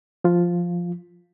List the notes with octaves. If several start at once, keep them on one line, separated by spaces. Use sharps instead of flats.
F3 F4